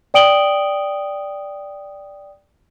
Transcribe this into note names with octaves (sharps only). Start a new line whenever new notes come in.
D5 G5 D#6 D7 F#7 G7